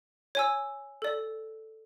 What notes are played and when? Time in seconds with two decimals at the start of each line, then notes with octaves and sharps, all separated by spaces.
0.35 C#5 G#5 E6
1.02 A4 D5